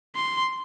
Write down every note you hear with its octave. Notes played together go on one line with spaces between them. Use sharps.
C6